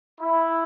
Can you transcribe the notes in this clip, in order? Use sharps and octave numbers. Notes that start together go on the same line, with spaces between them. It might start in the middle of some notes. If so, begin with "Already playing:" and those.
E4